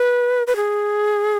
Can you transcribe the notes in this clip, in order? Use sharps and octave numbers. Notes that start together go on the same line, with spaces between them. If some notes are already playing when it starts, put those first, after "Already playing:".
Already playing: B4
B4
G#4